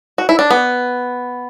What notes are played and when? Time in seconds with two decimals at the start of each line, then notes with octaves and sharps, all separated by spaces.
0.18 F#4
0.29 E4
0.39 D4
0.51 B3